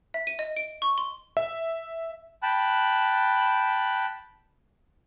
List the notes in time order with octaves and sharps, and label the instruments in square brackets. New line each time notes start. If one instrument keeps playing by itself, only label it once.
[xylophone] E5
D#7
D#5
D7
C#6
C6
[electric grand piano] E5
[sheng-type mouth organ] G5 A5 B5 F#6